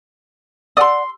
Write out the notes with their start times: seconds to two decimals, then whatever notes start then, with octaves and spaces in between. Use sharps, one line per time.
0.77 D5 F#5 C6 D#6